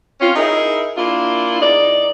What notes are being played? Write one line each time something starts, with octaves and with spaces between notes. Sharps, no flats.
C4 C#4 F4
D#4 E4 G#4 A#4
A#3 D4 E4 F4
E2 D#4 D5